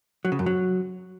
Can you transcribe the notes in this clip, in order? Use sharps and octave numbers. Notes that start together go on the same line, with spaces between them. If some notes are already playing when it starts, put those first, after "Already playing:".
F#3
C#3
F#2
F#3